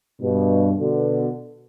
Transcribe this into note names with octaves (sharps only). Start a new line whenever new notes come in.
G2 B2
B2 D3